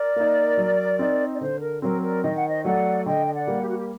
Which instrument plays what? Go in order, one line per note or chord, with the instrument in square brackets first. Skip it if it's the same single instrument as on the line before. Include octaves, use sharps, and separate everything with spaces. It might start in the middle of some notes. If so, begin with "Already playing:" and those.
Already playing: [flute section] A#4 D5
[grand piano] A#3 D#4
F#3
C4 D#4
[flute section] D5
[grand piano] D3 [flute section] C5
[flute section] A#4
[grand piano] F#3 C4 [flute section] A#4
[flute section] A#4 D5
[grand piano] D#3 [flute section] D#5
[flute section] F#5
C5 D#5
[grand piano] F#3 A3 [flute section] D5 F#5
[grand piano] D3 [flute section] D#5 G5
[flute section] D#5
D5 F#5
[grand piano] G3 A#3
[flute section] G4
F#4
G4